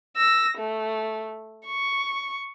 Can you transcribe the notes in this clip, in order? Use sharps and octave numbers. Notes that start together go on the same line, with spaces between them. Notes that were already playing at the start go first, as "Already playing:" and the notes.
E6 A#6
A3
C#6